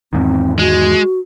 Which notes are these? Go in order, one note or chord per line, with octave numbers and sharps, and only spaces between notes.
E2 G#2 D#3 C4
G#3 F#4